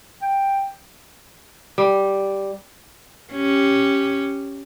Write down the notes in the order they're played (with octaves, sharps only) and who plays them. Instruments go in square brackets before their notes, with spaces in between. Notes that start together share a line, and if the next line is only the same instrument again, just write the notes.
[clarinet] G5
[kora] G3
[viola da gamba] C#4 G4